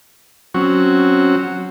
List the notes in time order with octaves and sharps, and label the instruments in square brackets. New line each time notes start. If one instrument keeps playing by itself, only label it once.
[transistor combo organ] F#3 C4 C#4 F#4